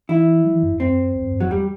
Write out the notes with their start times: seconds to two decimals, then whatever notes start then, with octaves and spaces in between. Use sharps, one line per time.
0.09 E3 E4
0.45 F#3
0.54 E3
0.63 F#2
0.71 E2
0.80 F#2 C4
1.15 E2
1.24 F#2
1.34 G2
1.40 F#2 F#3
1.51 E2 G3